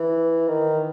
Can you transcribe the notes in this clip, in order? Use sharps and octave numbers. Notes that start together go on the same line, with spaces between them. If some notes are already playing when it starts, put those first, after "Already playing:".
Already playing: E3
D#3